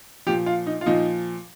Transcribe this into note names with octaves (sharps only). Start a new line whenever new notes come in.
A#2 F3 G4
F4
D#4
F4
A#2 F3 D#4